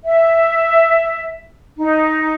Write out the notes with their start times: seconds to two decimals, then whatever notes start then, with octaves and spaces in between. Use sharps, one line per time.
0.04 E5
1.77 D#4